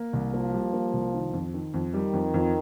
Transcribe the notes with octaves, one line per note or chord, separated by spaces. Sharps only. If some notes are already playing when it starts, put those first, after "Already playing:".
Already playing: A#3
C2
F3 A#3
G3
A#3
C2
D#3
F2
D#3
F2
D#3 G3
F2
F2